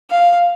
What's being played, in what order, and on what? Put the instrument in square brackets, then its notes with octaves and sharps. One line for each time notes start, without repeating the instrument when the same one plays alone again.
[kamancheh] F5